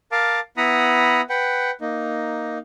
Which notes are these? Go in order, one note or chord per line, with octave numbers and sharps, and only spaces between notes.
A#4 F5 A5 D6
B3 E4 F#5 A#5 B5 D#6
B4 F#5 G5
A#3 D#4